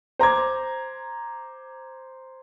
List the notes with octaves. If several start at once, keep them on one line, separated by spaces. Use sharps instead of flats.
C5 A#5 D6 G#6